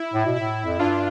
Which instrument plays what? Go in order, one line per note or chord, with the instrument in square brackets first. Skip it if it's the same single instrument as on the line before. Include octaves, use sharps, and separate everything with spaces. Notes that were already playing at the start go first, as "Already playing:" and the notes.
Already playing: [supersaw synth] E4
[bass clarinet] A2
B2
[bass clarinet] A2 [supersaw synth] E4
[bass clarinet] F2
[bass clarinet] G2 [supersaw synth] D4 F4